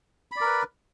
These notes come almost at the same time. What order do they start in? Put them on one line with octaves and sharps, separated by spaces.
B5 D5 A#4 B4